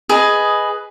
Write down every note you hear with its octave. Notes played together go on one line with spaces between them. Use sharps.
G#4 B4 D#5